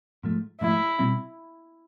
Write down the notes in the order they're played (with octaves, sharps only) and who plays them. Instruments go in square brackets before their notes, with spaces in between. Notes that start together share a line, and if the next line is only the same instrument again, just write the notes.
[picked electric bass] G#2 F3 A3
[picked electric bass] G#2 F3 A3 [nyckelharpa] E4
[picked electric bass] B2 G3 C4